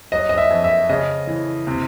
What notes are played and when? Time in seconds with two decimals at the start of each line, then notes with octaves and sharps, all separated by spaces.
0.12 F#3 D#5
0.29 D#5
0.38 E5
0.50 F2
0.64 E5
0.89 C#3 D#5
1.27 E3
1.67 C3